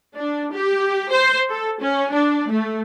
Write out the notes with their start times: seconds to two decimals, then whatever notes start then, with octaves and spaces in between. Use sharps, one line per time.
0.17 D4
0.53 G4
1.12 C5
1.49 A4
1.81 C#4
2.12 D4
2.50 A3